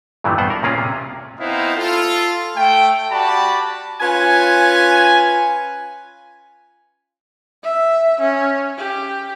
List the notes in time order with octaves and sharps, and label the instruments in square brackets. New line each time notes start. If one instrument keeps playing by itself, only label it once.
[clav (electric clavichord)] G2 A#2 E3 F#3 G3 A3
G2 B3 C5 F#5
A#4
A#2 C#3 A#3 C#4 F4 G#4
C3
[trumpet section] B3 C4 D#4 E4 C5 F5
F4 A4
A3 G5
F#4 G4 D5 A5 B5
[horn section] C#4 F4 B4 G#5
[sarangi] E5
C#4
G4